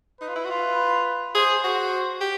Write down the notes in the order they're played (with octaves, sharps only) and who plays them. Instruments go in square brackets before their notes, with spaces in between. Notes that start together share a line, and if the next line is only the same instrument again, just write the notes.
[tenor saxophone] D#4 [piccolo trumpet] B4
[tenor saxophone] F4
E4
F#4
F4
[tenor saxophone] G#4 [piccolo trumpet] C5
[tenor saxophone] F#4 [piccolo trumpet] C5
[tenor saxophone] G4